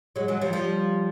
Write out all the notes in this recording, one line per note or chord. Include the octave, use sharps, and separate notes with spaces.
F#3 G#3
F#3 G#3
F3 G3
F3 G3